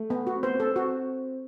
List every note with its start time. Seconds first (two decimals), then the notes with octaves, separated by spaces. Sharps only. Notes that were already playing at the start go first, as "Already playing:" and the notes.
Already playing: A3
0.10 B3
0.27 F#4
0.36 C4
0.43 B3 C5
0.55 C4
0.60 A4
0.65 C4
0.76 F#4